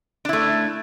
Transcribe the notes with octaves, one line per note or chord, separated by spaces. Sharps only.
A3 D4 E4